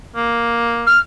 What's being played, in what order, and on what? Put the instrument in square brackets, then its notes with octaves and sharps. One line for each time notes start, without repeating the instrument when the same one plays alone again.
[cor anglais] A#3
[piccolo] F6